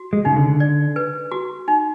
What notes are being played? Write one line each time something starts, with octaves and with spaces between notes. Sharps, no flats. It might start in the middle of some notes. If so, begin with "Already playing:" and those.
Already playing: F#4
G#3
C#3 D#4
D3
D5
B4
F#4
D#4